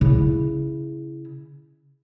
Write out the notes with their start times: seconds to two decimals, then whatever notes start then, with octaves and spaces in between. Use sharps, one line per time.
0.01 C#3 E4